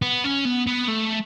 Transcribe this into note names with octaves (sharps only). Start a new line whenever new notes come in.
B3
C#4
B3
B3
A3